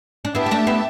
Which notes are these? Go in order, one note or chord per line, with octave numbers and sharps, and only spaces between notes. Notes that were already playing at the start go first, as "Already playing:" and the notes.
D4
B3 E4 G4 E5 A5
B3
A3 D4
B3 E4